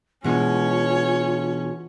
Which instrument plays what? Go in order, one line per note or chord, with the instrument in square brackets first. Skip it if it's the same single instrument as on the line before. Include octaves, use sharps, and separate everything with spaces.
[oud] B2 G#3 [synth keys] E3 B3 D4 [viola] C#4 C#5 [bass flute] F4